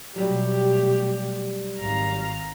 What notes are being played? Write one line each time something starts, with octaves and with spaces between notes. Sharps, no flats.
B2 F#3 G3 A3 G4
G#1 F5 A#5